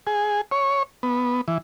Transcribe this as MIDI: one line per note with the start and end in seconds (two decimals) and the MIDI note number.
0.07 0.41 68
0.51 0.83 73
1.03 1.41 59
1.48 1.58 52